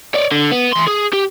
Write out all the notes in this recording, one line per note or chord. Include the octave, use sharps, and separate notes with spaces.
C#5 D5
D3
B3
E3 C6
G#4
G4